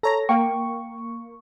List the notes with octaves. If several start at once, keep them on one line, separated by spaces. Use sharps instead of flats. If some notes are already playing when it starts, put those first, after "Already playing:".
A4 C#5 A#5 A#6
A#3 G5 C#6